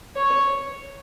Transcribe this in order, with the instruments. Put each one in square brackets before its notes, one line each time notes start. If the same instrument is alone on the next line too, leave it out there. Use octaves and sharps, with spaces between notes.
[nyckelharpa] C#5